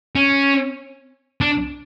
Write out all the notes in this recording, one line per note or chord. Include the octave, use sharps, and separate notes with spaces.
C#4
D4